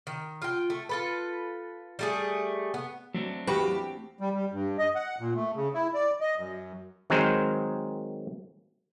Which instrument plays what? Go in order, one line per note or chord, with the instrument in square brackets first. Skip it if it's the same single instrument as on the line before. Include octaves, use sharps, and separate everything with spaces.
[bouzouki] D#3
F4 G5
A3
F4 A4 B4
G3 A3 G#4
B3
[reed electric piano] F#3 [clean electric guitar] A3 C4 D4
[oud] E2 F#4 B4 [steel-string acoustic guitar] G4
[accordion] G3
G3
G2
D#5
F#5
A#2
A3
C#3
E4
D5
D#5
F#2
[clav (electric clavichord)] D#3 F#3 G#3 C4 A#4 C5